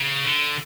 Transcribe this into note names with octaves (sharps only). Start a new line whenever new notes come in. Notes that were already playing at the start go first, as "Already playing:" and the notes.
Already playing: C#3
D3